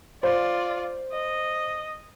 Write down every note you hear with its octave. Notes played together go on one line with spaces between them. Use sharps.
F4 C5 D5
D#5